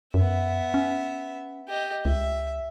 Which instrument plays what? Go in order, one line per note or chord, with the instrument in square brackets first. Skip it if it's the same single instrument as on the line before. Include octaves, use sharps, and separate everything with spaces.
[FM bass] F#2 [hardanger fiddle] B3 E5
[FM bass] C#4
[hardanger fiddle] G4 D#5
[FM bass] C#2 [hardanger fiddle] E5